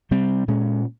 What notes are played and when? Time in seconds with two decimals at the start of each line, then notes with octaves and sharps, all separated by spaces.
0.11 C3 G3 C4
0.48 A#2 G#3 C#4